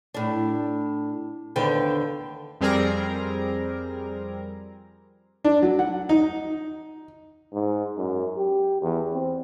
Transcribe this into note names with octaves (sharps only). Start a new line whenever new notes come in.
A2 D4
D#2 D3 B3 C5 G5
F2 G3 C4 G#4 A#4 A#5
D4
F#3
F#5
D#4
G#2
F#2
G4
E2
C4